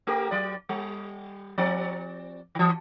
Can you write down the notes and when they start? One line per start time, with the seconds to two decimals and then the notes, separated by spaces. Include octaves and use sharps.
0.07 A3 G4 A#4
0.31 F#3 D5
0.69 G3
1.58 F3 C4 D5
2.55 D#3 E3